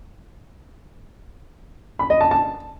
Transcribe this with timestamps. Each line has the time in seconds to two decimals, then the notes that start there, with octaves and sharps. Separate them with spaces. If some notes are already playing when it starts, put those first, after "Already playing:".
1.99 B5
2.10 D#5
2.21 A5
2.31 A5